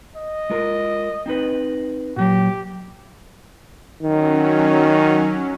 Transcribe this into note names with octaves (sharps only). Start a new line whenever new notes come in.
D#5
G#3 F4 A#4
C4 D#4 B4
A#2 F#3 G4
D#3 F#3 C#4